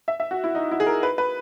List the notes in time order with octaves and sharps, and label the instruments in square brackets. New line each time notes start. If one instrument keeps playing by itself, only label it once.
[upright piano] E5
E5
F#4
E4
D#4
E4
G#4
A#4
B4
B4